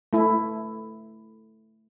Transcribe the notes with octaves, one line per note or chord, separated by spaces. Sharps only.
A3 E4